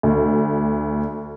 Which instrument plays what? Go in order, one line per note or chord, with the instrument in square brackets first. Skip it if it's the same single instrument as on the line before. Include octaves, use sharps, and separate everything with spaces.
[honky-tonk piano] D2